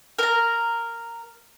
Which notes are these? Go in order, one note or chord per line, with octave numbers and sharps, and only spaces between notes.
A#4 A#5